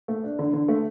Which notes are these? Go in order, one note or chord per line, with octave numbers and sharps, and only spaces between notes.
A3
D4
D3
D3
A3